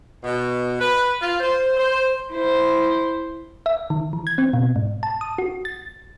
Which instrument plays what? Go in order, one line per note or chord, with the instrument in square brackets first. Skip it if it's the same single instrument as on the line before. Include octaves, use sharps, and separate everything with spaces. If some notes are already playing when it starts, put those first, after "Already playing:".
[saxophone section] B2
B4
F4
C5
C5
[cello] E4 C5
[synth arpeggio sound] E5
D#3
E3
G#6
C4
B2
G#2
A5
D#6
F#4
A6